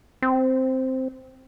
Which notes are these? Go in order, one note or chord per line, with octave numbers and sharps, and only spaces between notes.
C4